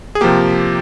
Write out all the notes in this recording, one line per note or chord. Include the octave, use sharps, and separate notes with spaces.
G#4
C3 F3 A#3 G4